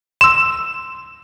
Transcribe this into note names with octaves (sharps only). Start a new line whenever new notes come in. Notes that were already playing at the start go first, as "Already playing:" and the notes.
C6 E6 E7